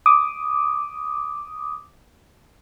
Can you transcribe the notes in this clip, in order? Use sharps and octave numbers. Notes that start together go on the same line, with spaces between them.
D6 D#6